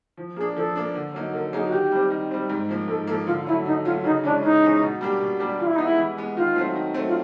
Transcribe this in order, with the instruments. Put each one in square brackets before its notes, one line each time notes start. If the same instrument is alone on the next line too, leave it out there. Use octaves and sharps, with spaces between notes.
[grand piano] F3
[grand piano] A#3 [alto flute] G#4
[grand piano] D4
[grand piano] F3 [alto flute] A4
[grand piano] A#3 D4
D3
F#3 A#3 D#4
[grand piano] D3 [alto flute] A#4
[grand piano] F#3 A#3 D#4 [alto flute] G#4
[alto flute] F#4
[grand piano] D#3 [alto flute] G4
[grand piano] G3 C4
D#3
G3 C4
G#2
F3 A#3
[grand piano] G#2 [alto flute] A4
[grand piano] A#3 [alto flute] A4
[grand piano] F3
[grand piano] D3 [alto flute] F4
[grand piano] F#3 A3 [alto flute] E4
[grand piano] D3 [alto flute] D#4
[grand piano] F#3 A3 [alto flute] F4
[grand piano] C#3 [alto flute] D#4
[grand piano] E3 G#3 C#4 [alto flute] D4
[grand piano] C#3 [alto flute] D#4
[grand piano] E3 G#3 C#4
B2
G3 A#3 D4 G4
B2
G3 A#3 D4 G4
[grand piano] E3 [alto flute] F4
[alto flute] E4
[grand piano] B3 [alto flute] D#4
[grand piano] G#3 [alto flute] E4
[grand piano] E3
G#3 B3
[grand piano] D#3 [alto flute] F4
[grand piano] F#3 A3 C4
D#3
F#3 A3 C4
[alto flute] F4